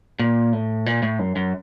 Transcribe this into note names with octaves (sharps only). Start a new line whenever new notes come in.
A#2
A2
A#2
A2
F#2
F#2